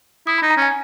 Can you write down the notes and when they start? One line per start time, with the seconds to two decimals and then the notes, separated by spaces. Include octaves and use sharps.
0.27 E4 D#6
0.38 B5
0.42 D#4
0.50 A#5
0.57 C#4 G#5